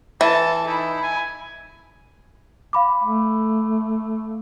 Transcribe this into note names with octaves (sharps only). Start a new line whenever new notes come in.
E3 A4 A5
D#4 E4
G#5
F5 B5 D6
A3